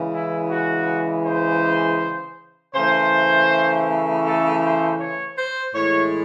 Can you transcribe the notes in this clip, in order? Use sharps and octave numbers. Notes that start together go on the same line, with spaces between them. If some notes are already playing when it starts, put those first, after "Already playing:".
Already playing: C#3 E3 G#3
E4
F#4
C5
C#3 E3 A3 C5
A4
C5
C#5
C5
A2 E3 G#3 C#5